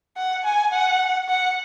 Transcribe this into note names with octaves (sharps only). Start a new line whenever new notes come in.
F#5
G#5
F#5
F#5